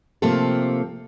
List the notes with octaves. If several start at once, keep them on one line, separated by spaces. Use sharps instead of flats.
C3 F3 A3 A#3 C4 A4